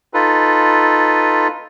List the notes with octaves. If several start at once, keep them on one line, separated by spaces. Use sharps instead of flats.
D#4 F4 A4 B4